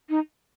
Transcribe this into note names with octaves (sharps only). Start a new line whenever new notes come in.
D#4